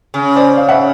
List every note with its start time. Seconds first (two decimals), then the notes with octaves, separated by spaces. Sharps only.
0.14 C#3
0.36 C5 D5
0.57 F5
0.69 E5 F#5